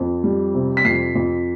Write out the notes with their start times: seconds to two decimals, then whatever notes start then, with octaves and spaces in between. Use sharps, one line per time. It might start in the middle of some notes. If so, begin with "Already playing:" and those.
Already playing: F2
0.24 G3
0.54 C3
0.77 B6
0.85 F2 C7
1.15 F2